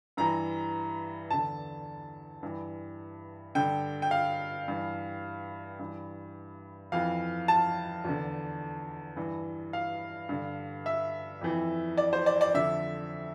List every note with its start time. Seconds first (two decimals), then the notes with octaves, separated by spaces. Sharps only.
0.17 G2 E3 A#5
1.30 E2 D3 A5
2.43 G2 E3
3.55 G2 D3 G5
4.02 G5
4.11 F5
4.68 G2 E3
5.79 G2 E3
6.92 F2 E3 F5
7.48 A5
8.05 E2 D3
9.16 G2 E3
9.73 F5
10.29 G2 D3
10.86 E5
11.41 F2 E3
11.97 D5
12.13 C5
12.26 D5
12.41 D5
12.54 F2 D3 E5